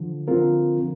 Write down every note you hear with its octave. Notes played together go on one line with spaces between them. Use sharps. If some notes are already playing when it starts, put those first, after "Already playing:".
Already playing: D3 F3
D3 F3 C4 F4 A#4
D3